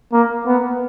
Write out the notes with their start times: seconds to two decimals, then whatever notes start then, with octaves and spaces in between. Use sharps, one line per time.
0.12 A#3
0.46 B3